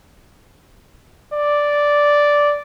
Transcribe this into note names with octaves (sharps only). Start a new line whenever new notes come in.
D5